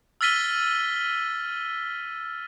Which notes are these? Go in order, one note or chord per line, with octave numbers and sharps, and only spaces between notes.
E6 F6 A6 B6 D#7 G7